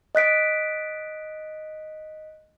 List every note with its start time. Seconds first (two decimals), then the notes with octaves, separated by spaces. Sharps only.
0.15 D#5 F#6 B6 D7